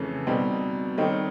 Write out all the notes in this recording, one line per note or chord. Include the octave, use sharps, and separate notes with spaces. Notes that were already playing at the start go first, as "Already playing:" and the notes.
Already playing: F2 C#3 E3 A3 C#4
B2 G3 C4 D#4
D#3 G3 C4 D#4 C#5